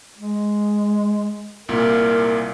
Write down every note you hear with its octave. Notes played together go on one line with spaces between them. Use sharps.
G#3
C2 A#2 A#4